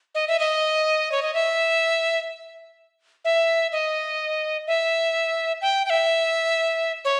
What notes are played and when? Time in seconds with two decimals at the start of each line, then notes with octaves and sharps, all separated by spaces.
0.15 D#5
0.28 E5
0.39 D#5
1.12 C#5
1.22 D#5
1.34 E5
3.25 E5
3.72 D#5
4.67 E5
5.62 G5
5.85 G5
5.90 E5
7.05 C#5